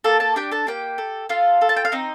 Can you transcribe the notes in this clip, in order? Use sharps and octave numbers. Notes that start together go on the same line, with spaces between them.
A#3 A4 A5
A4 A5
D4 G4 G5
A4 A5
A#3 G4 G5
A4
F4 A4 F5
A4
A5
G5
F5
C4 D#4 D#5